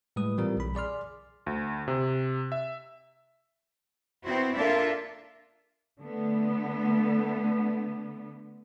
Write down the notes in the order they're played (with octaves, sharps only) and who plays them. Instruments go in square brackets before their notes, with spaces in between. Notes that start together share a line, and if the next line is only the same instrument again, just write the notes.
[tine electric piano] A2 G3 G#3 B4 D#6
A#2 E3 G3 C4 F4 A#4
B1 B5
G#4 D5 C6 F6
[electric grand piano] D2
C3
E5
[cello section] B3 C4 E4 F#4 C5
A#3 D4 F4 A4 A#4 E5
D3 A3 B3